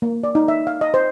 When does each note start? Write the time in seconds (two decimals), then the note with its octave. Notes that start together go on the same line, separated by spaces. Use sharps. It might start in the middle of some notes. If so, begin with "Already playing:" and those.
0.02 A#3
0.24 D5
0.35 D#4
0.48 E5
0.67 F5
0.81 D#5
0.94 C5